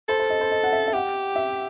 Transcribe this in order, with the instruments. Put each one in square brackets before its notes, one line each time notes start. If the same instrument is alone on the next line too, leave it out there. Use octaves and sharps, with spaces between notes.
[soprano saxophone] A4 [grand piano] C5
[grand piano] C5
D#5
C5
D#5
F#5
E5
E5
[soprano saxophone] G4 [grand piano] F#5
[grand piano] E5